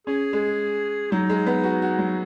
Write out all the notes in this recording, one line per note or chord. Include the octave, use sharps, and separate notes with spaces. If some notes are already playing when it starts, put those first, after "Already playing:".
C#4 G#4
G#3
F#3 D#4
G#3
B3
F#4
F#4
F#3